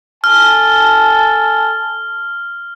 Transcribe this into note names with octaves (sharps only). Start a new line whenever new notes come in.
A4 G#5 A5 F6